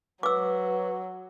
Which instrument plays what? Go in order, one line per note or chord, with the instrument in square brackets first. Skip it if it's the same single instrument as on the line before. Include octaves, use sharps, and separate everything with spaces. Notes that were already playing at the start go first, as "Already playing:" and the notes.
[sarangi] F#3 [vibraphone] B4 [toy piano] D6 E6